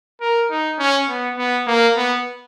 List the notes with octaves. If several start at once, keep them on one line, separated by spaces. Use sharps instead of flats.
A#4
D#4
C#4
B3
B3
A#3
B3